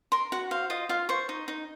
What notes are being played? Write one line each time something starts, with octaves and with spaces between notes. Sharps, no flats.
A#4 C6
F#4 F#5
C5 F5
F4 D#5
F4 F5
C5 C#6
D#4
D#4